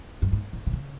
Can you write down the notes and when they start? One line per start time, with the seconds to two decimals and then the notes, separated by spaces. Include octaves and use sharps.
0.22 G2
0.32 G#2
0.53 A2
0.67 C3
0.73 C#3